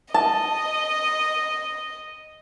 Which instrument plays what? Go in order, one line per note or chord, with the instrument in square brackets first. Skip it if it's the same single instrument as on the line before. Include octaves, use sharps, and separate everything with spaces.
[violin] D#5 [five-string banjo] A5